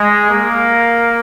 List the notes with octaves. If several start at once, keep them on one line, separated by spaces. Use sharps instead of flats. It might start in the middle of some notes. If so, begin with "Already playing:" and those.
Already playing: G#3
A#3